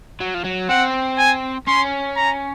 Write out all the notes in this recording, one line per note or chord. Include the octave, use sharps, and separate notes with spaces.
F#3
F3
F#3
C4 F#5
G#5
C#4 C6
A#5